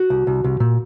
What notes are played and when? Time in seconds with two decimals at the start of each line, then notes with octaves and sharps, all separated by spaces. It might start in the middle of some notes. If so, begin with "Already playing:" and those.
Already playing: F#4
0.10 C2
0.27 C2
0.44 C2
0.60 A#2